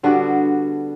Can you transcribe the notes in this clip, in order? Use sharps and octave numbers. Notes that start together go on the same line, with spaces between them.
D3 G3 B3 F#4